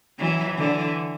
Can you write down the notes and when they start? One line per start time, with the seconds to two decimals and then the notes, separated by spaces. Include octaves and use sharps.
0.19 E3 F#3
0.57 D3 E3